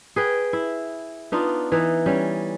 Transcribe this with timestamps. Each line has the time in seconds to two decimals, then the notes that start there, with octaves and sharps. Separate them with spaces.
0.16 G#4 B4 G5
0.53 E4
1.32 B3 D4 D#4 F4
1.72 E3 D#4
2.06 G3 C#4